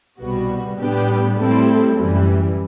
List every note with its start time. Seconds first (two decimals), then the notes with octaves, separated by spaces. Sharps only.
0.20 C2 B2 G3 B3 F#4
0.79 A2 G3 B3 D4 G4
1.38 A2 G3 C4 E4 A4
1.97 F#2 E3 G3